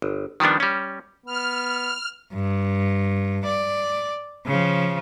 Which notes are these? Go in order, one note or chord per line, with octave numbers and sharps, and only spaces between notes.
G1
D#3 F3 G3 B3 D4
G3 C#4
B3 F6
G2
D5
C#3 F3